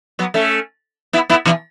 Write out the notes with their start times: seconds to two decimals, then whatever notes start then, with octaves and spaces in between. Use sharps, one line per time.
0.19 F#3 B3
0.34 A3 C#4
1.13 B3 E4
1.30 B3 E4
1.46 B2 E3